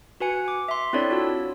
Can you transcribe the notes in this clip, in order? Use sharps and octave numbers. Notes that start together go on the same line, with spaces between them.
F#4 B4 G#5 C#7
D6
E5 C6
C4 D4 E4 A4 C#5 D5
F4 F#4 C#5 E6